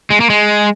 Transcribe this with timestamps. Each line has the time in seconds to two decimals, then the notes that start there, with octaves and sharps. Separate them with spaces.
0.10 G#3
0.20 A#3
0.30 G#3